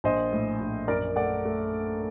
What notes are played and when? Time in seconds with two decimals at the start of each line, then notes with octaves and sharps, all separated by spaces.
0.04 A#1 C5 D#5
0.32 A2
0.61 A#1
0.88 F#2 A#4 D5
1.16 A3 D5 F#5
1.45 A3